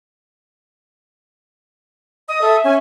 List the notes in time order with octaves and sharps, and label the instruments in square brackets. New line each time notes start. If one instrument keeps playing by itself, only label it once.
[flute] D#5 [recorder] D#6
[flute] A4 [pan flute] E5
[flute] C#4 [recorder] G#5